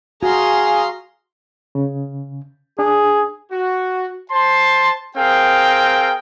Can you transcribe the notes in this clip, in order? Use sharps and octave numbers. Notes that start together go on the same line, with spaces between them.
F#4 G#4 F5 G#5 A#5 C6
C#3
D4 G#4
F#4
C5 A5 C6
C4 G#4 A#4 F5 G5